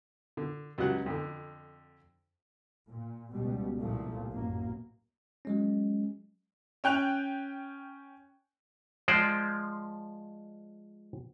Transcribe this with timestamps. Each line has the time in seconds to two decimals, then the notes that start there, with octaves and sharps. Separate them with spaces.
0.37 D3
0.78 C#2 F#3 G3 F#4 F#5 F#6
1.06 F2 D3
2.89 A#2
3.33 C#2 B2 G3
3.79 C2 A#2 F3 A3
4.31 A1 F#2 A#3
5.45 F#3 G#3 C#4
6.84 C#4 G5 F#6 F7
9.08 F3 G#3 C5 D5